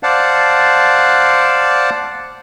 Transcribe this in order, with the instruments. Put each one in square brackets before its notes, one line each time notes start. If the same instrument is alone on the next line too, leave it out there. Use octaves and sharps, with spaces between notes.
[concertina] C5 D5 F5 F#5 A5